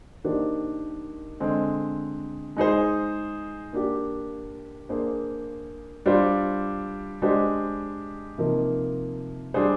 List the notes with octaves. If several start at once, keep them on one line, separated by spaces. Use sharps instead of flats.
D#3 A#3 D4 G4 C5
D3 G#3 C4
G#3 D#4 G#4 C5
A#3 D4 G4
A#3 D4 G#4 C5
G3 D4 F4 C5
G#3 D4 G4 C5
C3 F3 A#3 D#4 A#4
G3 D4 G#4 C5